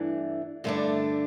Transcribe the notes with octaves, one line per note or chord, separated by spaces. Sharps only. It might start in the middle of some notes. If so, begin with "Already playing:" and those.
Already playing: G2 E3 A3 D4
G2 D3 A3 D4